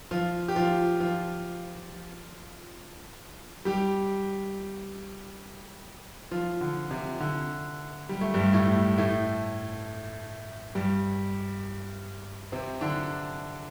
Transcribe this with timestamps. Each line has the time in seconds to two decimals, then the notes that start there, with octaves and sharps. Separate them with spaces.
0.11 F3 F4
0.48 G4
0.56 F3 F4
1.00 F3 F4
3.65 G3 G4
6.31 F3 F4
6.61 D3
6.91 C3
7.20 D3
8.09 G3
8.21 A3
8.34 G2 G3
8.53 A2 A3
8.98 A2 A3
10.75 G2 G3
12.52 C3 C4
12.81 D3 D4